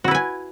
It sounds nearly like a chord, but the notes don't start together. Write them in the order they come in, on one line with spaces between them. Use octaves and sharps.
F#4 E4 B4 G#5